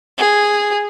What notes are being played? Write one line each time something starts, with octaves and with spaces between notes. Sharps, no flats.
G#4